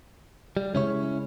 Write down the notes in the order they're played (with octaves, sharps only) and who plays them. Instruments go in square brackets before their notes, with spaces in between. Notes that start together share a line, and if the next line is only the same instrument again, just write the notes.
[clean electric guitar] G3
[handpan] C#3 G#3 [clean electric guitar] C#4 E4 C#5